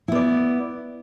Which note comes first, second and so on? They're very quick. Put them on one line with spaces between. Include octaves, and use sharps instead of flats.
E4 B3 D5